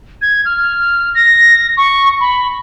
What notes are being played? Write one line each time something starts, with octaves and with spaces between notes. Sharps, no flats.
G#6
F6
A#6
C#6
B5